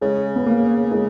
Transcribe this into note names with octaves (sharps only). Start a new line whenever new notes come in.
C#3 G#3
B3
A#3
G#3